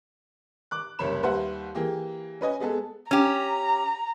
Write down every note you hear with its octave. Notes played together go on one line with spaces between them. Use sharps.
D6 F#6
F#1 C2 C#5 B5 E7
D#2 G3 B4 C5 E5 F#5
E3 A#3 G4 G#4
C#4 B4 D#5 G#5
G#3 B3 G#4 A4
C#4 G4 A#5